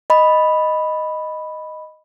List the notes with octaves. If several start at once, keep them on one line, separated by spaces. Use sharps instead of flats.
D#5 B5